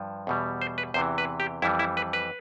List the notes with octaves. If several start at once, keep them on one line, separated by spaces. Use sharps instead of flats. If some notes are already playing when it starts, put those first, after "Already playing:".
Already playing: G2 F3
E2 B2 G3
C5
B4
E2 C3 E3 C5
B4
G4
F2 E3 G3 E4
E4
B4
B4